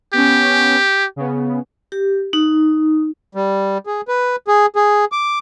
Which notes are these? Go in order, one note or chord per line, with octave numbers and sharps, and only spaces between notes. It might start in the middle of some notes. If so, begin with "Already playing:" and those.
B3 C#4 G4
C#3 B3
G4
D#4
G3
G#4
B4
G#4
G#4
D6